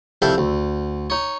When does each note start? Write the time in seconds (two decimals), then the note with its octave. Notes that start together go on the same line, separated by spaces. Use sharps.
0.22 C2 F2 A4 E5 F5 G5
0.38 D2
1.10 D#4 C#5